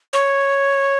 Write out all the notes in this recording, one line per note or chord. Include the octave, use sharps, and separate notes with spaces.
C#5